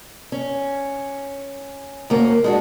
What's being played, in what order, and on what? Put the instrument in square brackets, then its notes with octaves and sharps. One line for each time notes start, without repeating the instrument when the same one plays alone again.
[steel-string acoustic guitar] C#4
D2 A#3 C#4
G#3 D4 F#4